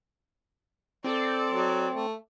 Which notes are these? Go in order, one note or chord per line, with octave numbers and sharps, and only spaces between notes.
C4 A4 D5
F#3
A3